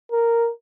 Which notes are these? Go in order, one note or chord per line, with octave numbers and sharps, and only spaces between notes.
A#4